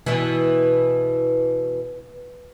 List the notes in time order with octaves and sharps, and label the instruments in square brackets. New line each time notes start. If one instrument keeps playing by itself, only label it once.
[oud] B2 E3